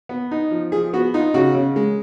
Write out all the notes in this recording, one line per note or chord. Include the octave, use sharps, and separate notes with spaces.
B3
D#4
F3
F3 G#4
B3 F#4
D#4 F4
C#3 F#4
C#3
G#3